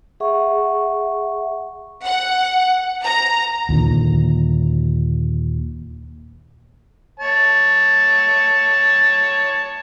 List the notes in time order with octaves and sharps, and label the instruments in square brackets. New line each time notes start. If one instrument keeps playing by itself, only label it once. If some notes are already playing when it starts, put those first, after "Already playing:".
[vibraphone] G#4 E5 F#5 C#6
[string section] F#5
A#5
[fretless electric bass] D#2 A#2 D3
[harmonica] C#5 A5